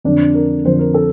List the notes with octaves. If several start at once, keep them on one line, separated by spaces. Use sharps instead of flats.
F2 D3 F3 D4
A#4
F2 D3 F3 C5
A#4
A4